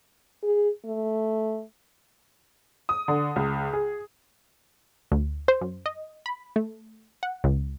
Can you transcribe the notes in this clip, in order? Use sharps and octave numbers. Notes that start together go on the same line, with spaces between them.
G#4
A3
D#6
D3
C#2
G#4
D2
C5
F#2
D#5
B5
A3
F#5
C#2